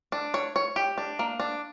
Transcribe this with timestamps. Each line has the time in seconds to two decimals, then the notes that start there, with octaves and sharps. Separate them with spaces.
0.12 D4
0.34 C#5
0.56 C#5
0.76 G4
0.98 D4
1.19 A#3
1.40 D4